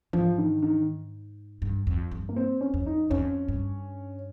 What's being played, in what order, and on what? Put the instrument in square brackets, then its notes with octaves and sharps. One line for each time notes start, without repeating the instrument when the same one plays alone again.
[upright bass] G#2 [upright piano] F3
[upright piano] D#3
D#3
[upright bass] G2
F2
G2
[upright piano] A#3
C4
C#4
[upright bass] F2
[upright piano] D#4
[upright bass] F2 [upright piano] C#4
[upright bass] G2